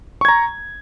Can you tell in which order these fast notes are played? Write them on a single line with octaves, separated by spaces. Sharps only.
C#6 G#6 A#5